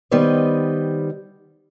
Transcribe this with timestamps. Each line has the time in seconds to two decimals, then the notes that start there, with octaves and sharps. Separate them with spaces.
0.11 D#3 G3 B3 B4 C5 D#5